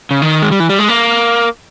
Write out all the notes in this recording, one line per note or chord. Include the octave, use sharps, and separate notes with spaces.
C#3
D#3
G#3
G3
E3
G3
G#3
A#3